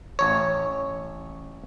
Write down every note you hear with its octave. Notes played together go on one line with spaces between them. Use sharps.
A1 C#5